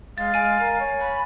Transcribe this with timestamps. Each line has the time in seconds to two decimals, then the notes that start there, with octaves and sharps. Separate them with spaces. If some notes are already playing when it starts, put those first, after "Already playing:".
0.18 G#3 F5 A6
0.34 G#3 G#5 D#7
0.60 A#4
0.80 C#5
1.01 B5